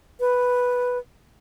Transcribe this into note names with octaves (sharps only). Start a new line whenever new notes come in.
B4